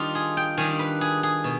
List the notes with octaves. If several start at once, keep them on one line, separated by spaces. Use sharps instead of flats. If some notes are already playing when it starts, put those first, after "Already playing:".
Already playing: D#3 G3 D4 D#4 F4
G#4
G5
D#3 G3 D4 G#5
B4
G#4
G#4
B2